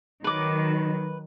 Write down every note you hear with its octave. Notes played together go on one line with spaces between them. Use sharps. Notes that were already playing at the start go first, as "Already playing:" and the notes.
D#3 F#3 B4 D6